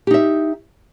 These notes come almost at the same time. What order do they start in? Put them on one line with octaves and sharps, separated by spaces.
G4 D#4 E5